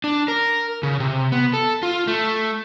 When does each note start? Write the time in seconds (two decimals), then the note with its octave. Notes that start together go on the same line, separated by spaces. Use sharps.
0.04 D4
0.28 A#4
0.83 C#3
1.00 C3
1.32 B3
1.53 A4
1.83 F4
2.07 A3